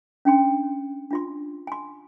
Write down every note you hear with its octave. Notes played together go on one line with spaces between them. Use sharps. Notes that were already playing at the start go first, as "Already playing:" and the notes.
C#4 D4 G5 C6
D4 F4 C6
G#5 C6